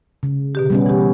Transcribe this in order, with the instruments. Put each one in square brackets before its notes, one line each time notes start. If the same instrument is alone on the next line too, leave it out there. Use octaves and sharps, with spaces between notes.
[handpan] C#3
[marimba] B2 D3 G4
[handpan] G3 B3 C#4
[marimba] E3 G4